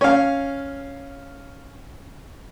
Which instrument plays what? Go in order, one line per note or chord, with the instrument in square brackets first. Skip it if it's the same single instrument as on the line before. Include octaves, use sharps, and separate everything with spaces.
[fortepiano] C#4 F5